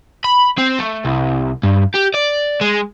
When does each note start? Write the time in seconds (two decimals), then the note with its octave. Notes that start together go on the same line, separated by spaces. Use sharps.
0.24 B5
0.58 C4
0.79 A3
1.05 C2
1.63 G2
1.94 G4
2.14 D5
2.61 G#3